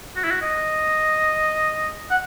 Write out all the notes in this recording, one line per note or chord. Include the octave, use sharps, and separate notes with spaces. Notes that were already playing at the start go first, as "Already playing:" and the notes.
F#4
E4
F#4
D#5
F#5